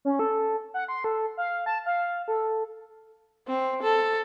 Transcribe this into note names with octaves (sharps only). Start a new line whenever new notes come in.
C#4
A4
F#5
C6
A4
F5
A5
F5
A4
C4
A4